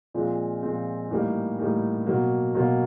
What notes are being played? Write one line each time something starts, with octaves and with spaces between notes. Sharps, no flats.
A#2 F3 G#3 C4
A#2 F3 G#3 C4
A2 E3 G3 A#3 D#4
A2 E3 G3 A#3 D#4
B2 F#3 A#3
B2 F#3 A#3